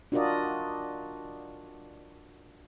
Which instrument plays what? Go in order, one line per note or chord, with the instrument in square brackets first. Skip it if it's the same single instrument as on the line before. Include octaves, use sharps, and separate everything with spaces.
[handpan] D4 F4 F#4 A#4 D5 D#5